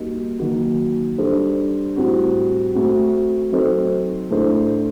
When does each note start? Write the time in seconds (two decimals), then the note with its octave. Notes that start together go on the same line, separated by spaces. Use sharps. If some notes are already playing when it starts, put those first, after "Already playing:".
Already playing: G3 A#3 D#4 F#4
0.39 D#3 F#3 A#3 F#4
1.18 G3 D4 A4 C5
1.96 A2 G3 C4 F#4
2.74 A3 C4 F#4
3.52 F#3 C4 D#4 A4 C5
4.30 A2 A3 D4 A4 C5